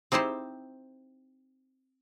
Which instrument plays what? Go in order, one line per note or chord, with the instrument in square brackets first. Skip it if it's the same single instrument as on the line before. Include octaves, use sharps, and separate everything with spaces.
[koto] C4 D#4 E4 G4 C5